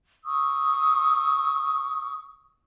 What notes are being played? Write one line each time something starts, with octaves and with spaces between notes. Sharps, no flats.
C#6 D#6 E6